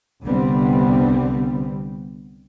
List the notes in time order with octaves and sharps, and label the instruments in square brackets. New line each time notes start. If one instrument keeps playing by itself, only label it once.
[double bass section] C2 D3 G3 B3 C4